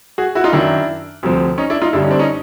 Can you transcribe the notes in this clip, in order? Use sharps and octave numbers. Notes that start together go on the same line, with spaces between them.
F#4 G#4
E4 F#4
D#4 F4
F#2 D#3 F#3 D4 E4
D2 C3 F3
C#4 D#4
D4 E4
D#4 F4
G2 D3 G3 D4 E4
C#4 D#4
C4 D4
C#4 D#4